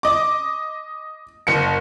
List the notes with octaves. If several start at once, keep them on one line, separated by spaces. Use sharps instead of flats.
D#5 D6
F#1 C#7